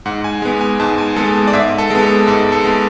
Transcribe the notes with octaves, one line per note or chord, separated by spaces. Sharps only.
G#2 F#5
G#5
G#3 B3
G#5
G#2 A5
G#5
G#3 B3 A4
D5
G#2 E5
A4
G#3 B3
A4
G#2 A4
A4
G#3 B3